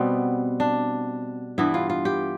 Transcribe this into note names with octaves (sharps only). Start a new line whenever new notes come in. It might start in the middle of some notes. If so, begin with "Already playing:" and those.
Already playing: B2 G3 B3 C4
D4
G2 E3 B3 E4
F4
F4
G4